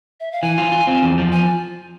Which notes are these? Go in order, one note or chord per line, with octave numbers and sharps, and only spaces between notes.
E5
F5
E3 G#5
F4
F4
C4
E2
F3
G#5